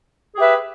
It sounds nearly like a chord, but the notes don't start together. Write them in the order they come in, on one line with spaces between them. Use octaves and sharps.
G#4 G4 B4 E5